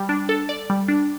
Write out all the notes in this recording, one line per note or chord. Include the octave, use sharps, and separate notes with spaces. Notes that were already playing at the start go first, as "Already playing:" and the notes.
Already playing: G3
D4
A4
D5
G3
D4